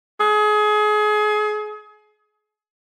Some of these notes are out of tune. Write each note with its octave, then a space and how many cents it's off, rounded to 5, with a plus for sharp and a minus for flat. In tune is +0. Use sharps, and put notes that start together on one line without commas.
G#4 +30